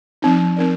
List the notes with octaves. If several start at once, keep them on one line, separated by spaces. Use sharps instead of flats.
F3 C4 D#4
C4 D#4 A#4 D5